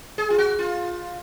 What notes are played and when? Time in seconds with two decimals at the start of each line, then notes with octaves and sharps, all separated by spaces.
0.18 G#4
0.30 F4
0.38 F#4
0.59 F4